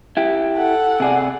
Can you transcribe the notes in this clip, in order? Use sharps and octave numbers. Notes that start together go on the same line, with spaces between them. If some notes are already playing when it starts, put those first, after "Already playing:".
E4 G4
A4 F#5
C3 G#4 D5